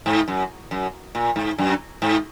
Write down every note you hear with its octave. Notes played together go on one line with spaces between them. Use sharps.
G#2
F#2
F#2
A#2
G#2
F#2
G#2